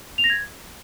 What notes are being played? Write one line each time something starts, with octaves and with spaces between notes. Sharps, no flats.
F7
A#6
G#6